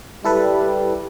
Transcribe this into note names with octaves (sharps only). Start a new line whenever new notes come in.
G3 E4 A4 B4